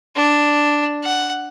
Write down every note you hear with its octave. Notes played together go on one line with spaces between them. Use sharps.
D4
F#5